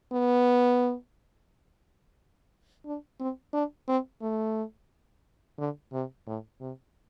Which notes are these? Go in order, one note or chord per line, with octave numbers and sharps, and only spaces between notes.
B3
D4
C4
D4
C4
A3
D3
C3
A2
C3